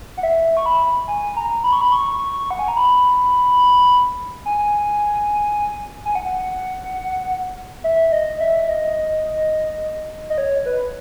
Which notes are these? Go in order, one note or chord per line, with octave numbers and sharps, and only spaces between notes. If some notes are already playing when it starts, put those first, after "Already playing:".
F#5
E5
C#6
B5
G#5
A#5
B5
C#6
B5
C#6
F#5
G#5
A#5
B5
G#5
G#5
F#5
E5
D#5
E5
D#5
D#5
C#5
B4